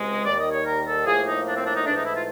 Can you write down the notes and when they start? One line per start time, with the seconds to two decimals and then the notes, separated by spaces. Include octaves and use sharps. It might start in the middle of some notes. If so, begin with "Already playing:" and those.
Already playing: C#2 C3 G#3
0.25 D#2 D#3 G3 D5
0.39 D#5
0.52 C#5
0.66 A#4
0.86 A4
1.06 A2 F3 A#3 G#4
1.26 D#4
1.46 D4
1.55 C4
1.65 D4
1.75 D#4
1.85 G#2 E3 A3 D4
1.95 D#4
2.05 E4
2.15 F4